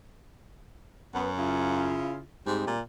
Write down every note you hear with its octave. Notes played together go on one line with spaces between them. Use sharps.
F#2 B3
C#3 E4 F4
G#2 G3 G#3 C4
A#2